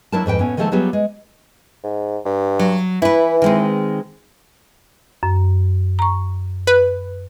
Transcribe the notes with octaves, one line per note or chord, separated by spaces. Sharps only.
F#3 D4 E4 A#4 A5
F2 G#2 B4 G5
A2 B3 C#4
D#3 F3 G#3 A3 A4 A5
F#3 G3 B3 F4 G4 G#4
G#3
G#2
G2
F#3
E3 E4 B4
D#3 G#3 C4
F#2
A#5 C#6
B4